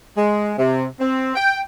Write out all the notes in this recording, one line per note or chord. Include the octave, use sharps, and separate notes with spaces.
G#3
C3
C4
G5